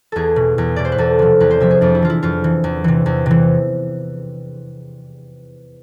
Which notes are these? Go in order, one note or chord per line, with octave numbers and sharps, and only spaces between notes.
E2 G#4 A4
B2
E2
B2 D5
C5
B4
E2 A4
C3 F3
E2 B4
C5
C3 F3 E5
G#4
F2 D4
E4
E3 F4
E4
F2 F4
E3
E2
C3 E3
E2
C3 E3